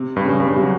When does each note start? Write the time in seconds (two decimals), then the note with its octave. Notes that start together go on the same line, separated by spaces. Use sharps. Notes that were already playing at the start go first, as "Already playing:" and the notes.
Already playing: C3
0.16 G2
0.25 C#3
0.40 G2
0.47 C#3
0.56 C3
0.63 F#3